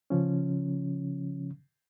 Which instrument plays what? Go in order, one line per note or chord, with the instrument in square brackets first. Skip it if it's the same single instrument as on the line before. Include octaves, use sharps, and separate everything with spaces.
[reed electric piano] C#3 F3 C#4